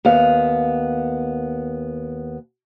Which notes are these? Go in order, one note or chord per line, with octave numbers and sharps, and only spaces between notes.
D#2 B3 F5